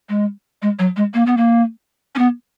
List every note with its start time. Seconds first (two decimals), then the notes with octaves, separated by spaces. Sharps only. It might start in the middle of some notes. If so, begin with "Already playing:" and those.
0.09 G#3
0.62 G#3
0.79 F#3
0.96 G#3
1.14 A#3
1.26 B3
1.37 A#3
2.15 C#4
2.19 B3